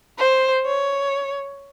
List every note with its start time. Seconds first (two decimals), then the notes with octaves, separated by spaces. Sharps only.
0.18 C5
0.66 C#5